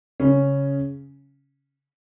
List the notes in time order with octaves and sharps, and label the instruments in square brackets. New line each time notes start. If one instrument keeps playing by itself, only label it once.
[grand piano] C#3 C#4